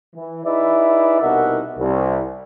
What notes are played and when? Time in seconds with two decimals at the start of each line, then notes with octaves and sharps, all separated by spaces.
0.15 E3
0.45 D#4 E4 G#4 B4 D5 E5
1.22 C2 B2 D#4 A#4 E5 F#5
1.79 C2